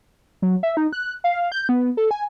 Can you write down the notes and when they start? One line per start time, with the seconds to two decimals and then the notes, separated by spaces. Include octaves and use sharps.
0.42 F#3
0.63 E5
0.77 D#4
0.93 F#6
1.24 F5
1.52 G6
1.69 B3
1.97 A4
2.11 G#5